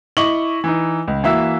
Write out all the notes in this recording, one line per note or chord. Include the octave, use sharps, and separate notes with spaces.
E4 D#5 C#6 D6 F#7 G7
E3 D#4
C#2
E3 A#3 F#4 E5 F5 E6